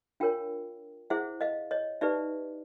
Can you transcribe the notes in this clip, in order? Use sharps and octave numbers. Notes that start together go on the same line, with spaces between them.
D4 F4 A#4 C#5 F5 G5
E4 G#4 C5 E5 F#5
D#5 F5
C#5 D#5
D#4 G4 B4 D5 E5